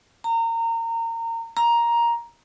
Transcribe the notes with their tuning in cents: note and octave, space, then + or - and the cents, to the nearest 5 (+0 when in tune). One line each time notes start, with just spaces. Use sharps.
A#5 -25
A#5 +10